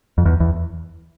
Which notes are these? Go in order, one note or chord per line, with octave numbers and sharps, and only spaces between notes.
F2
E2
E2